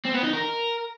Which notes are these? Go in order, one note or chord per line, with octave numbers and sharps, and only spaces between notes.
C4
B3
D#4
A#4